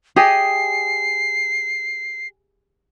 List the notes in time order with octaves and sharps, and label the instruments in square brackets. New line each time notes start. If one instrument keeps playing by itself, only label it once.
[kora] G4 G#4 D#5 [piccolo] C7